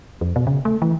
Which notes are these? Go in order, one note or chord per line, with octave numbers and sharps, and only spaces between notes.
F2
B2
C#3
A3
E3